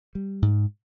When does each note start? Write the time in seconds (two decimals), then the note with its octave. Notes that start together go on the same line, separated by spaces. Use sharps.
0.15 G3
0.42 G#2